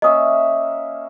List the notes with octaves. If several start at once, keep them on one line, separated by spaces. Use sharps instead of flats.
A#3 C#4 D#5 E5 D#6